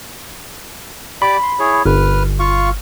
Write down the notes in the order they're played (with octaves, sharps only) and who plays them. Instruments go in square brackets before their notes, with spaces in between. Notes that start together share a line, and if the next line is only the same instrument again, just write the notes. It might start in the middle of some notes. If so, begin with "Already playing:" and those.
[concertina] G4 D5 D6 [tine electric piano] B5
[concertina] C6
E4 G#4 C#5
[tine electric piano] G1 [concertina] B4 F6
[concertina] F4 F5 C#6